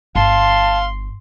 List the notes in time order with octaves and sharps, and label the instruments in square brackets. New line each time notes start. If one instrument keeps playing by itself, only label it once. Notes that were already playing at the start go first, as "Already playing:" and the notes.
[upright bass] G1 [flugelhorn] F5 [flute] A5 [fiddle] C6